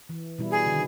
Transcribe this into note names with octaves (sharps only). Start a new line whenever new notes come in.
E3
B2 G3 E4
G#4
D3 D#3